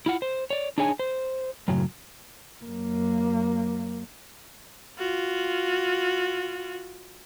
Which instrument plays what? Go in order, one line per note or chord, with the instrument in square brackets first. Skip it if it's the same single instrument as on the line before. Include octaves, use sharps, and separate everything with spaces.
[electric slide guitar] E4 F4 F#5
C5
C#5 D5
D4 D#4 G#4 C#5 G#5
C5
F#2 A2 C#3 F#3
[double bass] F#2 A#3
[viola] F4 F#4